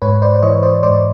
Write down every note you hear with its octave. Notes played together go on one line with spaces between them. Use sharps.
G#2 B4 C#5
C5 D5
D5
E3 C#5 D#5
C5 D5
G#2 C5 D5